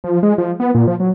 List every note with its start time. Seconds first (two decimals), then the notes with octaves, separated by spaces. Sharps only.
0.04 F3
0.23 G#3
0.38 F3
0.60 B3
0.75 A#2
0.88 F3
1.00 F#3